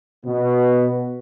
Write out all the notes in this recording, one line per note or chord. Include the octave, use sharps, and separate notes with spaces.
B2 B3